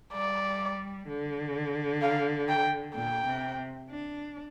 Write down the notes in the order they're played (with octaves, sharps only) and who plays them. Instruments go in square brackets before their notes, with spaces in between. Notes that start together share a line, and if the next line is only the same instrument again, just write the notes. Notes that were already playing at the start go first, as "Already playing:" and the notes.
[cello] G3 [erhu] D5
[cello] D3
[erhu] F5
G5
[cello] A#2 [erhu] G5
[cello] C3
D4